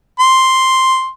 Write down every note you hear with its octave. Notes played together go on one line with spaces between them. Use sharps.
C6